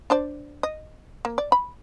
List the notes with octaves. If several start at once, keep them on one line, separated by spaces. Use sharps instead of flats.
D4 C5 D5
D#5
A#3
D5
B5